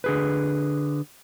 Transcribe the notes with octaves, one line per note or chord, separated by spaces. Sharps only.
D3 G#4 B4